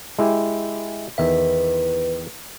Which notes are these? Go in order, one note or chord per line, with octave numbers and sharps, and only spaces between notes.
G#3 E4 G4
E2 D#3 B4 E5